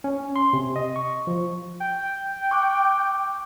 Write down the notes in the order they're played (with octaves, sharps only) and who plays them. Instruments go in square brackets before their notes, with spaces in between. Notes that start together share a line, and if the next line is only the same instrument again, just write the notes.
[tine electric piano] C#4
C6
C3
D#5
C#6
F3
[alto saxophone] G5
[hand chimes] C#6 D6 F#6